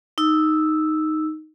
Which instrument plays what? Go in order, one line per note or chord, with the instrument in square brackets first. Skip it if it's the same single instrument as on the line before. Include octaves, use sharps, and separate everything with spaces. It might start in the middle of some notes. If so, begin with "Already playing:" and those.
[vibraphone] D#4 E6